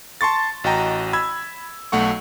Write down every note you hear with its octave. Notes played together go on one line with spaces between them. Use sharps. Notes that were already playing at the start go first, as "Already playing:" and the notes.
A5 C6 C#6 A6
A1 F#4 D#5 G5 A#5
B5 E6 G#6
B1 A3 F#5 C#6